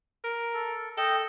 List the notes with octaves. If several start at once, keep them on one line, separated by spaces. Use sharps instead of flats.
A#4
A4
A4 D#5 G5